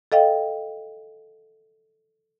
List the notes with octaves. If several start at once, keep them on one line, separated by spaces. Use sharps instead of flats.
A4 D#5 F5 G5